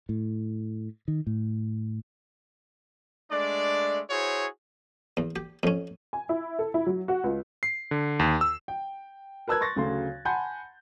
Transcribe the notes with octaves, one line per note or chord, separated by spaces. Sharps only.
A2
D#3
A2
G#3 A3 D4 D5
E4 F#4 G#4 C5 C#5
E2
G4
F2 C#4
G#5
E4
A4
E4
F#3
F#4
C#2
C7
D3
D#2
E6
G5
A#4 B4 A5 E6 F#6 G#6
C6 C#6 A6 A#6
D2 C#3 F#3 A3 C6
F#5 G#5 A5 B5 C6 G6